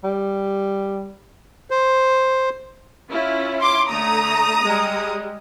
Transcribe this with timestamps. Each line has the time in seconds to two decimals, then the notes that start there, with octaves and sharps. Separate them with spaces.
0.04 G3
1.71 C5
3.11 C#4 E4 F4
3.61 C6 D6
3.90 D3 A3 A#5 D#6
4.63 G3 G#3